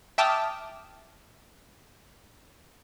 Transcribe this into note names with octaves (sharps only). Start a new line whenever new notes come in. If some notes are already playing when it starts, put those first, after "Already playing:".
E5 G5 A5 D6 D#6 F6